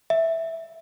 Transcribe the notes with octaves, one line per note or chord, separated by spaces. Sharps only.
E5